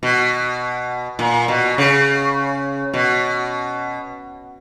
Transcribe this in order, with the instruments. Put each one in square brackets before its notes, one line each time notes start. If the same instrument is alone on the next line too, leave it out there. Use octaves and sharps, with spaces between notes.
[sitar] B2
A#2
B2
C#3
B2